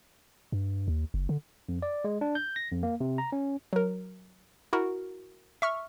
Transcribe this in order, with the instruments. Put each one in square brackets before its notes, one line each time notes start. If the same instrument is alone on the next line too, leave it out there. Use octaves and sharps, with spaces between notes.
[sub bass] G2
D#2
F#1
D3
[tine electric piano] F2
D5
G#3
D4
G6
A#6
F2
A#3
C3
A#5
C#4
[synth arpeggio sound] F#3 A#4
E4 F#4 A#4
E5 C#6 F6